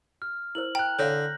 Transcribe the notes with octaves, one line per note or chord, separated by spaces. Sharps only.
F6
E4 A#4 C5 F#7
G5 A#5 F#6
D3 C#5 F5 G6 A#6